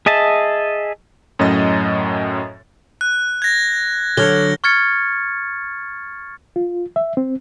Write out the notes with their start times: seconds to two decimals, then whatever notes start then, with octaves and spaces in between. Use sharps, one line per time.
0.06 G#4 D#5 E5 A5
1.39 F#2 A2 F#3 C#4 D#5 A6
3.01 F#6
3.42 G#6 A#6
4.17 D3 F#3 F6 G#6 G7
4.64 C#6 F6 G#6 A6 C#7
6.56 F4
6.96 E5
7.17 C4